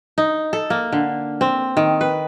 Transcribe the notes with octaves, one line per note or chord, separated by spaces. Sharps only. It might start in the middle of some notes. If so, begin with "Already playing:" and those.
D#4
A4
A#3
D3
C4
D#3
B4